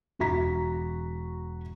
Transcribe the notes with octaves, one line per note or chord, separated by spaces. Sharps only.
E1 F#4 A#5 B6